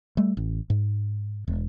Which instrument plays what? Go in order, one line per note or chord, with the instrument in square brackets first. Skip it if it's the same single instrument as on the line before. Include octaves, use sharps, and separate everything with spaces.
[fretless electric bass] G3 A3
A1
G#2
E1